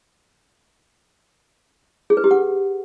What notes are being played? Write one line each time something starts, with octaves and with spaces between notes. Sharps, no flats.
G#4
B4
G4
F#5